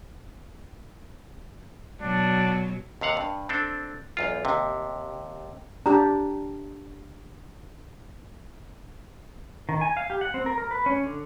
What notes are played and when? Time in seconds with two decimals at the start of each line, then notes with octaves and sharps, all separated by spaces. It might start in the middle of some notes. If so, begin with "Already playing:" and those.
2.01 B2 F#3 D4
3.01 D#2 C3 F5 F#5
3.17 G2
3.49 C4 D4 A4
4.17 B1 E2 F4
4.45 D#2 C3
5.86 D4 G4 A#5
9.69 D#3
9.81 G#5
9.97 F5
10.10 G4
10.21 F#5
10.34 C4
10.46 A#4
10.58 A#4
10.71 B4
10.86 C#4
11.04 D3